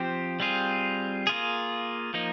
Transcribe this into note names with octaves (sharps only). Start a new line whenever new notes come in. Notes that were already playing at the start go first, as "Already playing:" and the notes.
Already playing: F3 C4 G4 C5
G3 C4 F4 G#4
A#3 F4 G#4
F3 A#3 D#4